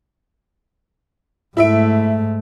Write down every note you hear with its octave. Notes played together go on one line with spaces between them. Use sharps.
G#2 A3 E4 E5 D7